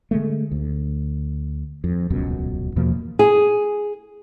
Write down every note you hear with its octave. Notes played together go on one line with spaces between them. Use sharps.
D3 G#3 A3
D2
F2
D#1 C#2 F#2 B2
E2 B2 F3 A#3
G#4